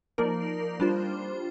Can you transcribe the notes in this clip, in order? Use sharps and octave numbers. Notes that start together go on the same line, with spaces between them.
F3 A#3 D#4 A#4 D5
G3 D4 F4 C5